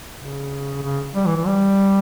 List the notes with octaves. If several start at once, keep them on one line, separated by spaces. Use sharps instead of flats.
C#3
C#3
G3
E3
E3
G3